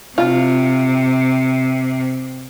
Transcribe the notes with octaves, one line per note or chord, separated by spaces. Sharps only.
C3 F4